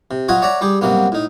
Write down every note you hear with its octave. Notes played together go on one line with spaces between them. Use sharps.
C3
F#3 F4 D#5 F#5 G#5 C#6
C#5 D5 E5 F#5 A#5
G3 G4 G#4
G2 C3 F#3 A#3 B3
A2 D#4